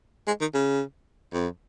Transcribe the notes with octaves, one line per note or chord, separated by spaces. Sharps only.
G#3
D#3
C#3
F2